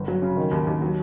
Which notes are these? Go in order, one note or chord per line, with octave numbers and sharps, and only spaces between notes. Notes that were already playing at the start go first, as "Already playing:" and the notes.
Already playing: G1
F#3
C#3
D#3
D#2
D#2
F#3